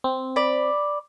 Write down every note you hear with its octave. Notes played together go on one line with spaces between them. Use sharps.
C4
D5 B5